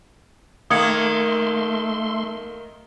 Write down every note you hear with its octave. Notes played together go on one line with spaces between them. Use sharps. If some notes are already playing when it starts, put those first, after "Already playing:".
D#3 A3 A#3 C6 D#6 G#6 C#7